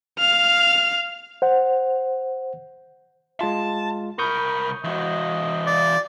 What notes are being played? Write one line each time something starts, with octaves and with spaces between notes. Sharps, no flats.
F5 F6
C5 F#5
G#3 F4 A5
C2 A#4 B5 C#6 D#6 G6
E3 F#4 D#5
D5